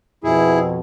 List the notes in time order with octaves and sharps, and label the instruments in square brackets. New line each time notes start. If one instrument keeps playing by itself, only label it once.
[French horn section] F2 B2 [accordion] E4 G#4